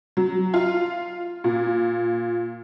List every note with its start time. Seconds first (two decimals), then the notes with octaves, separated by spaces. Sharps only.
0.17 F#3
0.54 F4
1.44 A#2